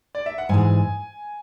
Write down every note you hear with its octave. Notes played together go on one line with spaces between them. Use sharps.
D5
E5
F#5
G#2 E3 G#3 G#5